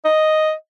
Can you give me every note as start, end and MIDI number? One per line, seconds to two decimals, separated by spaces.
0.05 0.53 75